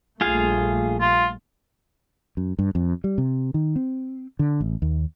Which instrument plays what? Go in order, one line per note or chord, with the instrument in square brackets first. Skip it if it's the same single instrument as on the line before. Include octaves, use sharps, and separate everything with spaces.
[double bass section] A#1 G3 A3 [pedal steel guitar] F4 G#4 F5
[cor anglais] F4
[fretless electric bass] F#2
G2
F2
G3
C3
D#3
C4
D3
A1
D#2